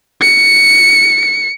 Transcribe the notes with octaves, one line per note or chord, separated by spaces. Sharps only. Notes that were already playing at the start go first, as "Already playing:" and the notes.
C#7